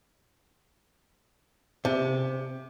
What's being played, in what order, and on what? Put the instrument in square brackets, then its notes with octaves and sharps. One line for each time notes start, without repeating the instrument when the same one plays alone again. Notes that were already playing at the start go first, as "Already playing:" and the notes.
[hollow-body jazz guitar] C3